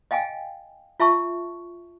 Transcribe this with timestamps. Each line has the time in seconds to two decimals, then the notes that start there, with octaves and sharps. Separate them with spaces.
0.11 D#5 F5 G5 G#5
1.00 F4 E5 A5 C#6